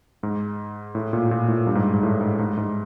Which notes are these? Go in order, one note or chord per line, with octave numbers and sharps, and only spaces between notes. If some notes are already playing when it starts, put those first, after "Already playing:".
G#2
A2
A#2
A#2
A2
G2
G#2
G#2
A2
G#2
G#2
G#2